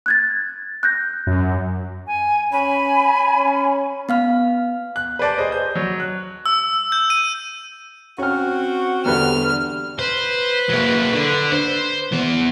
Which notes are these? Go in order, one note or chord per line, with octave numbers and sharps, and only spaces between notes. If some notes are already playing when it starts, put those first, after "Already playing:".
F#6 G#6 A6
F#6 G6 A#6
F#2
G#5
C#4 G#5 B5
C#4
B3 F5 F6
F#6
B4 C5 D5 A5
G#4 C5 D#5
G6
F#3
F#6
E6
G6
D#7
C4 C#4 F#4 F6
E2 D3 G3 B4 F6
B4 C5
F#3 A#3
D3
C5
E3 B3